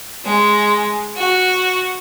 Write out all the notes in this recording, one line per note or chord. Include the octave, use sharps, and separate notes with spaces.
G#3
F#4